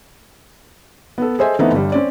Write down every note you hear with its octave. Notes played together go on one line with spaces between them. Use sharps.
B3 A4
G#4 A4 C5 D#5 E5 G#5
E3 A3 B3 C4 D#4
G1 G3
C4 C#4 D5